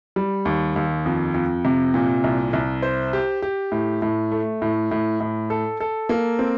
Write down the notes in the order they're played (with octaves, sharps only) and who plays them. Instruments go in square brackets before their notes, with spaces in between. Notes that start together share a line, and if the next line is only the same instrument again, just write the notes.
[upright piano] G3
D#2
D#2
F2
F2
C3
A#2
C2
C2
C5
G4
G4
A2
A2
A3
A2
A2
A2
A4
A4
A#3
C4